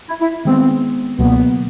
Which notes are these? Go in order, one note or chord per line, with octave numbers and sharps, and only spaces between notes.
E4
E4
D#3 G#3 B3 C4
C#2 B2 F#3 A#3 B3